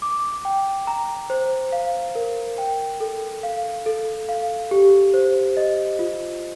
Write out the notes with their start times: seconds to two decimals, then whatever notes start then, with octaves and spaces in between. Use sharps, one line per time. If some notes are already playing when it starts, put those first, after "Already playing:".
0.02 D6
0.45 G5
0.87 A#5
1.30 C5
1.72 F5
2.15 A#4
2.58 G5
3.00 A4
3.43 F5
3.86 A4
4.29 F5
4.71 G4
5.14 C5
5.57 D#5
5.99 F4